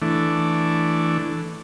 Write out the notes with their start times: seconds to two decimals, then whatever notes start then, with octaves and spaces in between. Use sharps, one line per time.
0.02 E3 A3 D4